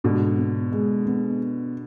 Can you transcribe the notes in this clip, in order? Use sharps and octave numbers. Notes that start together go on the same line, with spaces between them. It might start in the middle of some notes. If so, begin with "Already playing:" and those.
G#2 B2 D3
B3
G#3
B3